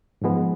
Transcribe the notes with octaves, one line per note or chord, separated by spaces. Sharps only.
G#2 F3 G#3 B3